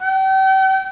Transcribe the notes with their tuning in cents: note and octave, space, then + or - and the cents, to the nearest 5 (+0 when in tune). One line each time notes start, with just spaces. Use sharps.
G5 -40